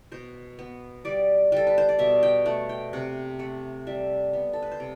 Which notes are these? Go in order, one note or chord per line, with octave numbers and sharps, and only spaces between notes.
B2 C5
B3
G3 D5
G3 A4
B4
C5
D5
B2 E5
G5
A3 F#5
G5
C3 F#5
A3 F#5
G3 E5
B3
A4
B4
C5
C3